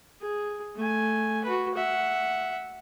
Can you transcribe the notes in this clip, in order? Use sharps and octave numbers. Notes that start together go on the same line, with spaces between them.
G#4
A3 G#5
F#4 B4
E5 F#5